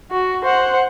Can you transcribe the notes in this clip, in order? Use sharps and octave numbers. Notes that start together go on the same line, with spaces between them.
F#4
C5 F#5